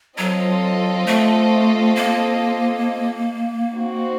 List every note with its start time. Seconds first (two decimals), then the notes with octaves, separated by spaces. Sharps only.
0.18 F#3 C4 F4 A4 D#5
1.06 A3
1.95 A#3
3.73 C4 D#4 F#4